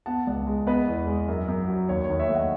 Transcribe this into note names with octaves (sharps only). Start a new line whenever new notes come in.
B3 F#5 A5
C#2
G#3
B3 B4 D#5
E2
G#3
F#2
F#2
F#3
D#2 C#5
C#5
D#2
C#5 E5
A3
D#5 F#5